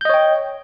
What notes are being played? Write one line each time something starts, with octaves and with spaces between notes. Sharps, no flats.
C#5 D#5 G5 G6